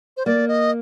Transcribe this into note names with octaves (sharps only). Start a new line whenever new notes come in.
C5
A#3 D5
D#5